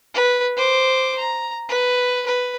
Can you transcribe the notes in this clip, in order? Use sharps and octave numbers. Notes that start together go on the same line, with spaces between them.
B4
C5 D6
A#5
B4
B4